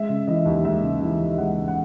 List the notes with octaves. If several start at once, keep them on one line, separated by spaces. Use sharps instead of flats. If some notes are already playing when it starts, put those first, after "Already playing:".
Already playing: G#3 E5
C#3
E3 D#5
D#2
G#3 E5
C#3
E3
D#2
G#3 F#5
C#3
F#5